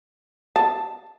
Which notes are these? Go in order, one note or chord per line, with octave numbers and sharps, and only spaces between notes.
A5